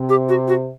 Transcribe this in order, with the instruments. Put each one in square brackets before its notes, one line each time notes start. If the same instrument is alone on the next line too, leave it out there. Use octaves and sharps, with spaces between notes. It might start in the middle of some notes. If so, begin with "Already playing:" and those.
Already playing: [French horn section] C3
[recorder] G4
F#4
F#4